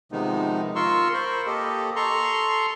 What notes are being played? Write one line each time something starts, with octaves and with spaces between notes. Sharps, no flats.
C3 D#3 F3 G#3 B3 D#4
F4 A#4 C6 C#6 E6
A#4 C5 B5 C#6
A#3 G4 A4 D#5
A4 A#5 C6 C#6